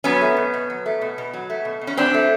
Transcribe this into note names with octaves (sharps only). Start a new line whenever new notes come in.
F#3 B3 C#4
A3
B2
B2
F#3
A3
B2
B2
F#3
A3
B2
B2
C#4
F#3 C4 D4
A3